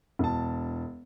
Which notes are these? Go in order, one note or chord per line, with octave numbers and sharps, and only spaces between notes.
E1 A5